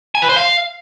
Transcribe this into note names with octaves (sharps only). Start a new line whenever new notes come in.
G#5
B4
C5
F5